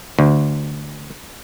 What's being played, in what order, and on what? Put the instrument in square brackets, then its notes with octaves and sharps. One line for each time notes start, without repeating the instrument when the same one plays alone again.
[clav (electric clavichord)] D2